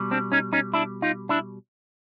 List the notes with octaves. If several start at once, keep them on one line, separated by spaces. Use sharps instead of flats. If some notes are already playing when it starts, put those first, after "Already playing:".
Already playing: B2 G3
C4 D4
C#4 D#4
C#4 D#4
D4 E4
D#4 F4
D4 E4